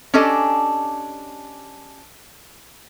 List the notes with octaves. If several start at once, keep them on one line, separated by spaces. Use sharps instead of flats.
C#4 D4 G4 A4 D#5 G#5